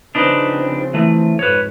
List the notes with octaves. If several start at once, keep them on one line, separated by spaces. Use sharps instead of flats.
C#3 F3 C4 D4 D#4 B4
E3 A3
F2 G#2 B4 C#5